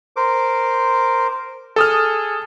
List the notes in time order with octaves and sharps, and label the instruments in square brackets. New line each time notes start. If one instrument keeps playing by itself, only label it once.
[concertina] A#4 C5 D6
[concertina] G#4 [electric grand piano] A4 D#6 F6